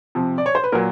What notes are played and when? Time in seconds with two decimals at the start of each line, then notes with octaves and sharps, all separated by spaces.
0.15 C3 F3
0.38 D5
0.46 C#5
0.55 C5
0.64 B4
0.72 A#2 F#3 A#4